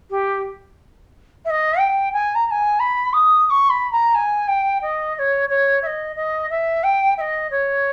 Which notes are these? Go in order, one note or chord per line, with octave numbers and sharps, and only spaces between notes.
G4
E5
D#5
G5
G#5
A#5
A#5
G#5
B5
D#6
D#6
C#6
B5
A#5
G#5
G5
D#5
D#5
C#5
C#5
E5
D#5
D#5
E5
G5
E5
D#5
C#5